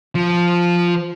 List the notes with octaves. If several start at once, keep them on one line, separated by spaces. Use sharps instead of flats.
F3